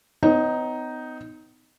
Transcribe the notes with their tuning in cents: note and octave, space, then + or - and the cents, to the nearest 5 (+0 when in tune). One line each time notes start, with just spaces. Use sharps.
B3 +45 D#4 +0 C#5 +0